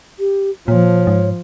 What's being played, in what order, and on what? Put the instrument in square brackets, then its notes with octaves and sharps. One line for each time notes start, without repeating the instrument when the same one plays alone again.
[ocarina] G4
[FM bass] A#2 [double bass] F3 [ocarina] C#5
[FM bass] G#2